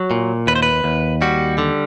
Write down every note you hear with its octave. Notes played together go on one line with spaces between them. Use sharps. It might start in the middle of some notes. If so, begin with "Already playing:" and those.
Already playing: F#3
A#2
D#2 B4
C5
B4
D#2
G3 F#4
D3